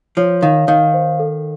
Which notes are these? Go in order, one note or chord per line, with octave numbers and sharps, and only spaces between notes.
F3 C#5
D#3 F5
D#3 F5
C5
A4